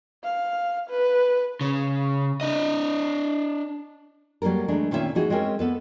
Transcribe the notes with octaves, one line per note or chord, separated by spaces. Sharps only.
F5
B4
C#3
D4 D#5
F#3 G3 A#3 A4 A#4
E3 G#3 A3 D4
A#2 D#3 C4 C#4 C5 E5
E3 D#4 F#4 G#4
G#3 C4 C#4 A#4
B3 A4 B4